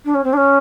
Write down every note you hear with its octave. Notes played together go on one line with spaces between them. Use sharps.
D4
C#4
C4
D4
C#4